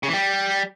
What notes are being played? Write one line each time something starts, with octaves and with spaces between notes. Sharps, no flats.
C#3
E3
G3